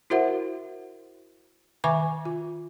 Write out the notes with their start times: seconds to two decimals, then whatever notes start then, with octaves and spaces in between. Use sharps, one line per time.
0.10 E4 F#4 A#4 C5 E5 F#5
1.84 D#3 B4 E5 G#5 C#6 D6
2.25 F4